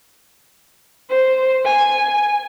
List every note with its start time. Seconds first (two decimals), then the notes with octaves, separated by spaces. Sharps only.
1.10 C5
1.65 G#5